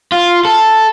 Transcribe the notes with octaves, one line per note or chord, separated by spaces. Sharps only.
F4
A4